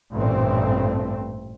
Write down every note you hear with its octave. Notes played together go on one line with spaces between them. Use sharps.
A1 G2 A#2 A3 C4